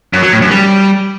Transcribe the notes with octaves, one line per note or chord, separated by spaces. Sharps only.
F#2
F#3
A2
F#2
G3